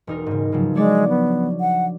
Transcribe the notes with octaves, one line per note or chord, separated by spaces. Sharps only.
E1 D#4 A#4
G#2 C#3
C#3 F3 F#3
G#3 D4 C#5 D5
B3
F#5